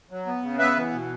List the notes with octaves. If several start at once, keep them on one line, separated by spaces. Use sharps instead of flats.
F#3
B3
C#3
B3 B4 E5
E3
B2